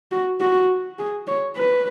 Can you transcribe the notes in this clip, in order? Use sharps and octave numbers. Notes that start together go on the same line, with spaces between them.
F#4
F#4
G#4
C#5
B4